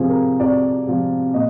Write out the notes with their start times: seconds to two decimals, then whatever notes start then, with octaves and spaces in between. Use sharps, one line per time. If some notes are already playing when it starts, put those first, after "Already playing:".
Already playing: F2 C3 F3 F4 G#4
0.09 A#4
0.40 F2 D5
0.86 C3 F3
1.34 A#2 D#5